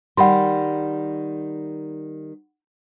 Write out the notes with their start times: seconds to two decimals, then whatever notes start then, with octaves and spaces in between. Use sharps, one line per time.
0.17 D#3 G3 F#5 B5 C6